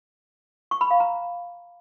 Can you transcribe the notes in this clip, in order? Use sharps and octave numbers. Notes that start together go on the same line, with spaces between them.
C#6
B5
F5
A#5